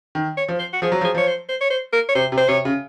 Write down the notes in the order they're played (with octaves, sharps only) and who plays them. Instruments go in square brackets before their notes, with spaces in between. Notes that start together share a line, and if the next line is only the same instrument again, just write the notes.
[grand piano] D#3
[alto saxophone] C#5
[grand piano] F3
[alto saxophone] C5
F#4
[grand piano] F3 [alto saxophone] G#4
[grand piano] F#3
F3
[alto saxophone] G#4
[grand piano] F3 [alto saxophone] C#5
[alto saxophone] C5
C5
C#5
C5
A#4
C#5
[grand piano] C3 [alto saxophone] C5
[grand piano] C3
[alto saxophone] C5
[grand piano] C3 [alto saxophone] C#5
[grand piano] C#3